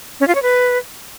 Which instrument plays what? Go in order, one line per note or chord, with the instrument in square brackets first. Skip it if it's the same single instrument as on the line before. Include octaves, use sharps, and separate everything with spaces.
[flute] C#4
F4
C#5
B4